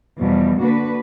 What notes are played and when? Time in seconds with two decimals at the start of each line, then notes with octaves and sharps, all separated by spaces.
0.20 E2 B2 F3 G3
0.61 D3 A#3 D4 F#4 B4